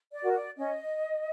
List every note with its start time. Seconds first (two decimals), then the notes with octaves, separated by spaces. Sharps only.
0.13 D5
0.23 F#4 A#4
0.35 D5
0.57 C#4 D#5